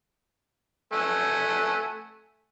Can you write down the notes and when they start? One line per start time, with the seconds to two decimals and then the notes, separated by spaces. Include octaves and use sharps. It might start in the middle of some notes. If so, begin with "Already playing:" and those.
0.93 A3 F#5 G#5